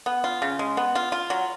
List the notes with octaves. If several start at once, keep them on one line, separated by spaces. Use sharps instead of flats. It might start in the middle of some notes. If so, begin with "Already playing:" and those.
B3
F4
C#3
G#3
B3
F4
F4
F#3